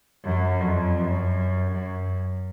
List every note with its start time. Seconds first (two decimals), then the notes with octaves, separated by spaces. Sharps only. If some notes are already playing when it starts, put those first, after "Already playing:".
0.25 F#2
0.61 F2
0.98 F#2
1.71 F#2